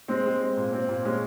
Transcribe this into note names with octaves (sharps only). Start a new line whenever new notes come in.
G#3 C4
G#3
C4
A#2
C4
A#2
G#3 C#4